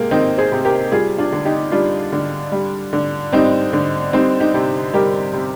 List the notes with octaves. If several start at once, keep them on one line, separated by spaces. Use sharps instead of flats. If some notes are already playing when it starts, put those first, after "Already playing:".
Already playing: C3 G#3 A#3
D#3 C4 D#4
G#4 C5
C3
G4 A#4
G3 F4 G#4
D4 F4
D3
D#4 G4
G3 D4 F4
D3
G3
D3
G3 C4 D#4
D3
G3 C4 D#4
D#4 G4
C3
G3 G4 A#4
C3